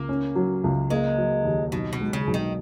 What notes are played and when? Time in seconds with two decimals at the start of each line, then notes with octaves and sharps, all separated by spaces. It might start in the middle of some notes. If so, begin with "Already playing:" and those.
Already playing: C#2 A#3
0.09 C#4
0.35 F#3
0.64 C#2
0.90 G#3 A#3
1.18 F#3
1.45 D#2
1.72 B1 B2
1.93 B2
2.00 G#3
2.13 C#3
2.27 B1
2.34 D#3